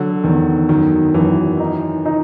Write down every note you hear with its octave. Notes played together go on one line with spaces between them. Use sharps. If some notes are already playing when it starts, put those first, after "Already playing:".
Already playing: D3 F#3
E2 D#3
F#2 D#3
F#2 E3
D#4
D#4